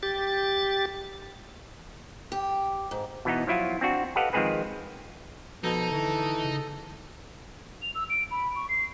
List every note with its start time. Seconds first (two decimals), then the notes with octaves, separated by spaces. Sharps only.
0.03 G4 A6
2.32 G4
2.91 G#2
3.25 B2 E3 B3 D#4
3.47 F3 F#3 E4 F4
3.81 C4 D4 F#4
4.16 G4 A4 B4 D#5 F5 F#5
4.33 D#3 F3 G#3 C4 G#4 B4
5.64 B2 F3 D#4 A4
5.92 D3 E3
6.45 C#3
7.82 F7
7.95 E6
8.10 D7
8.31 B5
8.56 C#6
8.69 C7